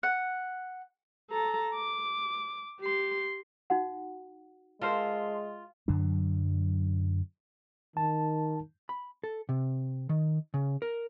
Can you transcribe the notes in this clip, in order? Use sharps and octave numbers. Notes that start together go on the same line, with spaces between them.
F#5
A4 A#5
D6
G4 C6
D#4 F#4 F#5
G#3 F4 A4 A#4 C5
F#2 D3 F#3 D4
D#3 A5
B5
A4
C3
D#3
C#3
A#4